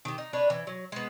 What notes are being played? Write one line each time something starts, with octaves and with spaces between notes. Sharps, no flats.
D#3 G4
D#4
D4 B4 C#5
E3
F#3
G#3 B3